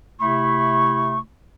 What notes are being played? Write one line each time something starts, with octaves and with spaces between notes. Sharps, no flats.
C3 A3 E4 B5 C#6